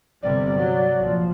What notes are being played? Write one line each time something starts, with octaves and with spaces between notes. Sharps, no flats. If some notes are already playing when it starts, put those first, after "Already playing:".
G1 C3 G3 D5
F#3
A#1 F3